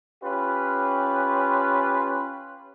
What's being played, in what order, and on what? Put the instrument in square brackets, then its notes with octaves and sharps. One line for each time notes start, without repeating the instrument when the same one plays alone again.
[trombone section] C#4 F4 G4 B4